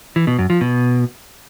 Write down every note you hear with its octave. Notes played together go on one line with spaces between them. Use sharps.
E3
B2
F#2
F3
B2